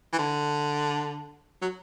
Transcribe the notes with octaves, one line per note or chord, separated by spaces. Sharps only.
E3
D3
F#3